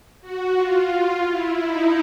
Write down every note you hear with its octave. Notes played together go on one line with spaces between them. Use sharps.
F#4
F4
E4
D#4